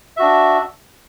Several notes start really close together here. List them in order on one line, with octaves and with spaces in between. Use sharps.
E5 F#4 D4